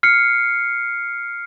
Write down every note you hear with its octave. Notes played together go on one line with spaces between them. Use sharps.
F6 C7 C#7